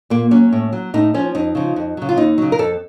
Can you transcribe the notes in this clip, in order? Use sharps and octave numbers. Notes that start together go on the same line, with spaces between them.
A#2 A#3
F#3 C#4
A2
F#3
A2 D#4
F3 C#4
F2 D#4
C#3 F3
F2
C#3 F#3
F4
D#2 D#4
C#3 F#3
A#4
F2 A4